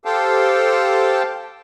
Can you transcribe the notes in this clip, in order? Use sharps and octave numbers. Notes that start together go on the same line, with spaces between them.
G4 A4 C5 F5 G5 A5